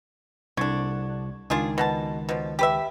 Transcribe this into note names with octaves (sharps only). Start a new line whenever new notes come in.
C2 D3 D4 C#6 G#6
C#2 D#3 D4 F4 G#4
B2 F#4 A5
B2 F3
G4 B4 E5